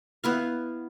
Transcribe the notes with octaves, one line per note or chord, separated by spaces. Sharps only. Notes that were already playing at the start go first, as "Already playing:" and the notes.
B3 E4 F5